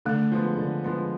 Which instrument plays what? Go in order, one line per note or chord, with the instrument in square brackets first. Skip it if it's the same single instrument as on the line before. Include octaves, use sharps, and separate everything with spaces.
[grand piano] D3 [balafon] A3
[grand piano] F3 G#3 B3
D3
F3 G#3 B3